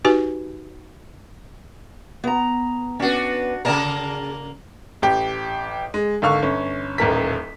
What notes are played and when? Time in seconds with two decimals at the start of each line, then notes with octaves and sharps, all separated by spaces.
0.05 D#4 F#4 G4 B4 G#5
2.24 B3 A#5
3.00 B3 C#4 D4 F#4
3.65 C#3 A#3 G#4 A#4 D5 A5
5.02 A1 G4
5.94 G#3
6.22 G#1 D3 F5 C#6
6.42 G1 C#4
6.98 D#1 A1 A#4 B6